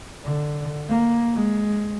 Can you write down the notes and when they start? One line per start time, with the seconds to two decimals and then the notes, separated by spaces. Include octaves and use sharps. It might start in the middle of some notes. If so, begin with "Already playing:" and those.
0.25 D3
0.89 A#3
1.33 G#3